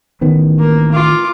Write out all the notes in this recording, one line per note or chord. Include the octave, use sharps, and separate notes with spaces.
A1 D#3 B3
A#3
F4 D6